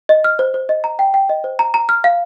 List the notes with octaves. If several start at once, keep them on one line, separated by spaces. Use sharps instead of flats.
D#5
F6
C5
C5
D#5
A#5
G5
G5
D#5
C5
A#5
A#5
F6
F5